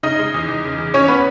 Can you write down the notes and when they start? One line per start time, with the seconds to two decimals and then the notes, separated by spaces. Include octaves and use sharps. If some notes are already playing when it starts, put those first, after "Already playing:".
0.03 C#3 D#4 D#5
0.19 G#3
0.34 E2
0.49 E2
0.64 C#3
0.78 E2
0.94 E2 C#4 C#5
1.08 B3 B4